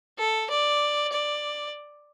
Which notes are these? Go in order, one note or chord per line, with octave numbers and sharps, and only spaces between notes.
A4
D5
D5